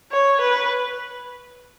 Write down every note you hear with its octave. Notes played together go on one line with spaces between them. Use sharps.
C#5
B4